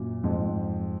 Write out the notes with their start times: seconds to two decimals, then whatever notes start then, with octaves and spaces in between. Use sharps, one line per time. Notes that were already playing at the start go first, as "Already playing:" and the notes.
Already playing: F#2 A#2
0.24 F2 G#2